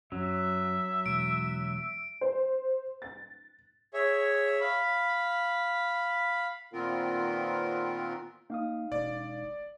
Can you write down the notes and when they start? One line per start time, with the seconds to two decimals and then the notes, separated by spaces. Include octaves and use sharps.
0.12 F#2 F#3 E5
1.06 E1 D7
2.21 C5
3.02 A6
3.94 G#4 C#5 E5
4.61 F5 B5
6.73 A#2 D#3 B3 C4 F4 A#4
8.50 A#3 D#4 F5 D#6
8.92 E1 D5